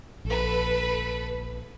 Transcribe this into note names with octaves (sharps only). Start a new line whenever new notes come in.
A#1 A4 B4